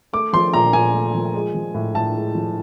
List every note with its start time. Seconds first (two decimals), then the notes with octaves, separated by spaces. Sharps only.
0.13 A3 D6
0.33 F3 C6
0.54 A#2 A#5
0.73 A#2 G#5
0.94 A3
1.14 F3
1.35 G#3
1.54 F3
1.74 A2
1.95 A2 A5
2.15 G#3
2.35 F3